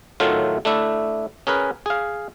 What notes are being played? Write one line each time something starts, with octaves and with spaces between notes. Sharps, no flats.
A2 D#3 F#3 A3 F4
A3 D4 E4
C#4 G#4 A#4 B4
G#4 F5